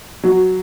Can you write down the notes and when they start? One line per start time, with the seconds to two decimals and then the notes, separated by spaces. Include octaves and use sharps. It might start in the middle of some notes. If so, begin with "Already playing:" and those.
0.23 F#3